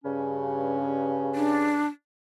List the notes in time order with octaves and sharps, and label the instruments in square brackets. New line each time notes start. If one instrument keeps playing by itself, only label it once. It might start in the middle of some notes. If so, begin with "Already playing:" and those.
[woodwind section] G2 C#3 C#4
[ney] D4